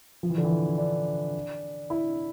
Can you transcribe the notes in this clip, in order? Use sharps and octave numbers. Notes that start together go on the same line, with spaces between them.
F3
E3
D3
E3
D4
E4